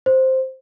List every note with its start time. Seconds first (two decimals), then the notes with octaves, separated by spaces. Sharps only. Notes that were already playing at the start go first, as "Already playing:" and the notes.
0.06 C5